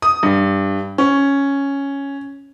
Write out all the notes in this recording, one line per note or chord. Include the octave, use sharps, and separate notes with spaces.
D#6
G2
C#4